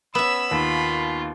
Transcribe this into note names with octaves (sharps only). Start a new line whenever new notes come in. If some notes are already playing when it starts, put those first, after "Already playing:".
B3 C#4 E5 B5 E6
D#2 F4